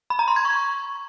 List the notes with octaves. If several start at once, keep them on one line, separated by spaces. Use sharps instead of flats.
B5
A#5
C6
G#6
C#6